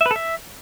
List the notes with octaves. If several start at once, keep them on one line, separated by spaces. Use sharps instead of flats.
E5
B4
A4
E5